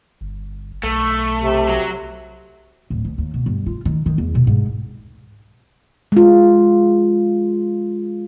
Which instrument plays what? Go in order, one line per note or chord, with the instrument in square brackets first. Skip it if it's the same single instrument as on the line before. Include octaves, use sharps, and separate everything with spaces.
[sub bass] G1
[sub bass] B1 [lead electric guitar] A3
[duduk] C3
[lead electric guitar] F#3
[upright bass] D1
D2
D#2
B2
G1
F4
D#3
D#3
E2
B2
G#2
[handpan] G#3 F4